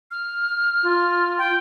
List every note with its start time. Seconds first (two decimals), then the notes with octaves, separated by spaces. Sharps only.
0.11 F6
0.83 F4
1.38 G5